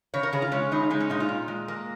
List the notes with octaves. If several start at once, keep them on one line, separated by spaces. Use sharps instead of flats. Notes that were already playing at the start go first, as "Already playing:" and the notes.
C#3 C#5
A#4
C#3 G#4
F4
G#3 C#4
C#3 D#4
G#3 D#4
C#4
A#2 D#4
F4
A#2
G#3
A#3